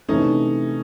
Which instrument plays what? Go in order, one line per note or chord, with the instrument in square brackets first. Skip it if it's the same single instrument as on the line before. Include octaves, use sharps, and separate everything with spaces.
[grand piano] C3 E3 A3 [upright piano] C#4 D#4